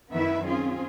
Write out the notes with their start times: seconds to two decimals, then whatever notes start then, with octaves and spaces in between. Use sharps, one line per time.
0.13 F#2 D#3 B3 E4 B4 E5
0.43 C4 C#4 F4 G#4